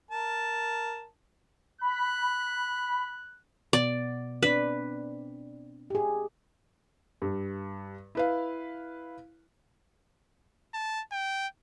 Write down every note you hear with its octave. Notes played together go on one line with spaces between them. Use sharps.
A#4 A5
B5 F#6
B2 B3 D5
C4 D4 B4 D5
G4 G#4
G2
E4 B4 F5
A5
G5